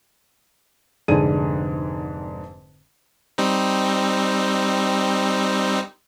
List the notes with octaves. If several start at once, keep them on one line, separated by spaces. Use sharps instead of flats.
F1 G#2 D3 G#4 D#7
G3 C4 D#4